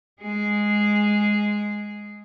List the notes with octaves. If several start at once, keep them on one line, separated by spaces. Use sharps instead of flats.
G#3 G#4